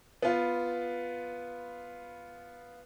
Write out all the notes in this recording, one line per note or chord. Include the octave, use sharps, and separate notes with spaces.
B3 F4